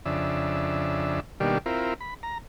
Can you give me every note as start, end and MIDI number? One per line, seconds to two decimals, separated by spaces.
0.05 1.20 41
0.05 1.20 49
0.05 1.20 62
0.05 1.20 76
1.40 1.58 47
1.40 1.58 51
1.40 1.58 55
1.40 1.58 58
1.40 1.58 62
1.40 1.58 67
1.66 1.94 60
1.66 1.94 64
1.66 1.94 65
1.66 1.94 70
2.01 2.14 83
2.23 2.38 82